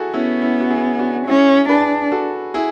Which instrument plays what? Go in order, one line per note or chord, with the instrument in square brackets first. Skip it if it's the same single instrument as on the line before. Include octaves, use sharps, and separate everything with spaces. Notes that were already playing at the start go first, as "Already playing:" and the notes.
Already playing: [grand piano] E4 F#4 G#4 A4
[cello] B3 [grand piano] C#4 E4
[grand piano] C#4 E4
F#4
E4 G#4
D4 F#4
[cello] C#4 [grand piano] E4 G#4
[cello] D4 [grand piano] G#4 B4
[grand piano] F#4 A4
E4 G#4